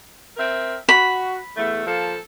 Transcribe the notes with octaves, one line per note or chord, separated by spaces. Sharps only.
C4 A#4 E5
F#4 B5
E2 A3
F3 A#3 A4